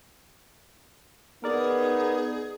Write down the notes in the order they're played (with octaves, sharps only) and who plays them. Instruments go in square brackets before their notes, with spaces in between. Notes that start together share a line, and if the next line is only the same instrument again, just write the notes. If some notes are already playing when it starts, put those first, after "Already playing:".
[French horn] B3 [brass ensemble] D#4 [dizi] G#4 [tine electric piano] A#4 D5